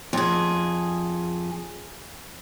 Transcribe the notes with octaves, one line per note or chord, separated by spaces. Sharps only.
F2 G#4